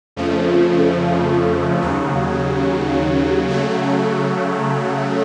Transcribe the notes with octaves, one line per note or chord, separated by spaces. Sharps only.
F2 C#3 F3 A3
D#2 C#3 F#3
C#3 F#3 A3